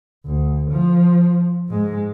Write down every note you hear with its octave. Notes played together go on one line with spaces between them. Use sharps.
D2
F3
G#2 G#3